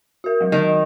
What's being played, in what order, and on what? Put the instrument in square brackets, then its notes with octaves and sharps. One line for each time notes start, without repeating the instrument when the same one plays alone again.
[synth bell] F#4 A#4
F#3 G#3
[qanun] D#3 [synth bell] D#5